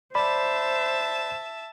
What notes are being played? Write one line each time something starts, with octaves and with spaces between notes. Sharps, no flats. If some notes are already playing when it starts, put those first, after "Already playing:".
C5 D5 E5 A5 B5